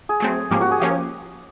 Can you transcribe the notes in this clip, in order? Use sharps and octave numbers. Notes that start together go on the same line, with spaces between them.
G#4
F#3 A3 C4
G#2 F3 A#3 C#4 G4
F#4
G#4
F3 A#3 C#4 G4